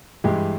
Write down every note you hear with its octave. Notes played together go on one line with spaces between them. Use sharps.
G2 E3 G#3 G4